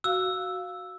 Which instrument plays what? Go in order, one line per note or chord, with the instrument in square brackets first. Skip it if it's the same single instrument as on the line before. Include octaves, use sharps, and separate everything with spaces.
[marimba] F#4 F5 [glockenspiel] E6